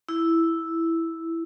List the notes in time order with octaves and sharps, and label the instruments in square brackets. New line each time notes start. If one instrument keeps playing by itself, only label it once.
[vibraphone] E4